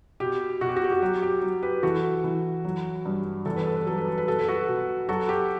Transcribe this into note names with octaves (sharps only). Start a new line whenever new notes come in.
B2 G4
B2 F#4
G4
F#4
G4
F#4
F#3 G4
G4
F#3
G4 B4
E3 F#4 A4
E3
F#3
G2
E2 A4
B4
A4
B4
F#3 A4
B4
A4
B4
B2 A4
B4
F#4 A4
B2
F#3 F#4 A4
G4